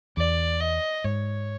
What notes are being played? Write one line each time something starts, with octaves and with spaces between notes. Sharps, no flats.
E2 D5
D#5
G#2 C#5